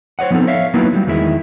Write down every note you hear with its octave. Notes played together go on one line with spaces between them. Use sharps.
C5 C#5 D#5 F#5
F3 B3 C4 D#4 A4
C#5 E5 F5
F#3 A#3 B3 D#4 E4 B4
F#3 G3
E2 D#3 G#3 E4